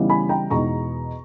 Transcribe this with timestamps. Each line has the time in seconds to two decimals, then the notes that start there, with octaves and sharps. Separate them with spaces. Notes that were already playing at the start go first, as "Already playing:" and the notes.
Already playing: C#3 E3 G3 B3 D#4
0.09 G#5 B5
0.29 G5 A#5
0.50 E2 B2 G#3 B3 D#4 A#5 C#6